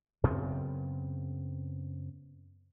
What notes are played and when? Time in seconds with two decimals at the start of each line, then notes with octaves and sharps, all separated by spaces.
0.24 F#2 C#3 B3 C4